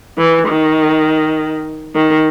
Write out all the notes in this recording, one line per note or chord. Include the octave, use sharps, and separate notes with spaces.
E3
D#3
D#3